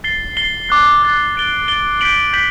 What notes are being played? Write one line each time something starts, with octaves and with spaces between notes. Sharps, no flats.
A6 C7 G7
A6 C7 G7
D6 F#6 A6
D6 F#6 A6
A6 D7 G7
A6 D7 G7
G6 B6 D7 F#7
G6 B6 D7 F#7